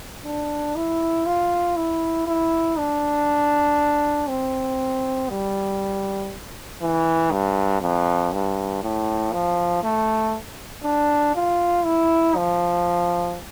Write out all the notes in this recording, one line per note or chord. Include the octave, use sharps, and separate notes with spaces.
D4
E4
F4
E4
E4
D4
C4
G3
E3
G2
F2
G2
A2
F3
A3
D4
F4
E4
F3